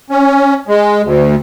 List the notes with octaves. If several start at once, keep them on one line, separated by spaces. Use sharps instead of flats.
C#4
G#3
D2